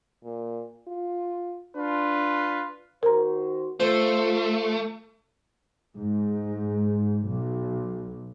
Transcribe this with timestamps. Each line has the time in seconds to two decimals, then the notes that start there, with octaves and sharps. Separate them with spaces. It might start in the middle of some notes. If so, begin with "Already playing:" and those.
0.24 A#2
0.87 F4
1.76 D4 F4 B4
3.03 D#3 F#4 A#4 C5 A#5
3.80 A3 F4 C5
5.96 G#2
7.29 B1